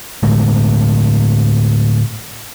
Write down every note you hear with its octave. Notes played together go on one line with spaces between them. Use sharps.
A2 D3 G#3 A3